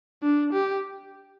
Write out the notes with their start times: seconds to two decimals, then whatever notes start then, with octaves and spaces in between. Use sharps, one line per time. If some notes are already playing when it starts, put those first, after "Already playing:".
0.23 D4
0.53 G4